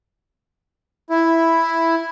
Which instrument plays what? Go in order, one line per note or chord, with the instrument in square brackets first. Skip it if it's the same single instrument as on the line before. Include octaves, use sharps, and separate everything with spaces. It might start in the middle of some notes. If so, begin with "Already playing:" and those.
[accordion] E4